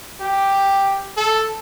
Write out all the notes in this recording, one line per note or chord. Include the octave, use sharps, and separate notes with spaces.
G4
A4